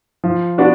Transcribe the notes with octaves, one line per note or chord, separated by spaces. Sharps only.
F3
B3 D4 F#4